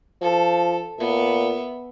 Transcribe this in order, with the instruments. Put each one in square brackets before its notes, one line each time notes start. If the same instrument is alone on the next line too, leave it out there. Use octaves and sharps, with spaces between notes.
[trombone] F3 [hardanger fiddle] A4
[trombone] A#2 [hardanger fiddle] B3 E5